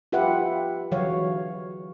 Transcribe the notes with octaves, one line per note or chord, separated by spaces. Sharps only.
F4 G4 B4 E5 F#5
D3 E3 F#3 G#4 C#5 F5